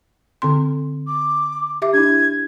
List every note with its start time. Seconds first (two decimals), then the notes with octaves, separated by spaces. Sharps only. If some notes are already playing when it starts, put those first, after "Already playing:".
0.42 D3 C4 C6
1.07 D6
1.82 G4 E5 D6
1.94 D4 E4 G#6